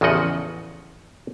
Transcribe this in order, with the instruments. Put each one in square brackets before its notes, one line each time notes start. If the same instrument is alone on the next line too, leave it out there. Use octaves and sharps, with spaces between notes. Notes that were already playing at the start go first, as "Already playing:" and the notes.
[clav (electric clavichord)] A1 E2 C#3 F3 D#5 F#5